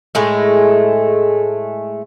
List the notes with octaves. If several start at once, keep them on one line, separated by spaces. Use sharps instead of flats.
A2 G#3 A3